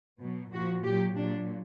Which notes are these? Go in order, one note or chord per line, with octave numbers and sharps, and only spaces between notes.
B2 F#3
A#2 F3 F#4
A#2 F#3 G4
A#2 F#3 D4